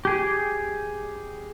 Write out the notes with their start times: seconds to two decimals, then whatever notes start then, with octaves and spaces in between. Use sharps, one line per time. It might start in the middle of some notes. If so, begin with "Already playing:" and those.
0.05 G4 G#4